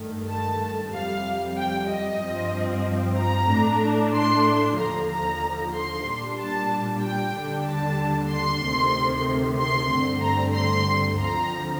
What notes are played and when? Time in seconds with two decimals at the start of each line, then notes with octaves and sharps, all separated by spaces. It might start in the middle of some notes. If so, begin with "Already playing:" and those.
Already playing: G2 D#3 A3
0.29 A5
0.92 F2 C3 G3 F5
1.57 G5
1.89 D#5
2.21 G2 F3 C4
3.18 A#5
3.49 A2 A3 D4
4.14 C6
4.78 D#2 D3 F3 A#5
5.10 A#5
5.74 C6
6.06 A#2 G3 D4
6.39 A5
7.02 G5
7.35 D#2 D3 G3 D4
7.67 A5
8.31 C6
8.64 D2 C3 D#3 A3
9.59 C6
9.91 G2 D3 A3 C4
10.23 A#5
10.56 C6
11.20 D2 D3 F3 C4 A#5